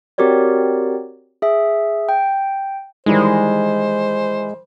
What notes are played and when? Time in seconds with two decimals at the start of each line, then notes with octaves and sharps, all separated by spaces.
0.18 C4 F#4 G4 A#4 C#5 D5
1.42 G#4 E5
2.09 G5
3.06 D#3 E3 G3 G#3 C5